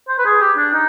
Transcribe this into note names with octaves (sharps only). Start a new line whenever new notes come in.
C5
B4
G#4
G4
D4
D#4